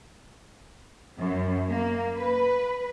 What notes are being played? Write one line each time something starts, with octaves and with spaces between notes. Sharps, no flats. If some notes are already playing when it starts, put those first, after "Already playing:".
F#2
A#3
B4